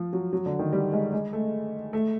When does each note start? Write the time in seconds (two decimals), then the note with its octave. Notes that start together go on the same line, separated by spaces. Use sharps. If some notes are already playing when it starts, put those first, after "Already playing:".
Already playing: F3
0.13 F#3
0.33 F#3
0.46 D3
0.59 D#3
0.73 G3
0.93 G#3
1.13 G#3
1.33 A3
1.93 A3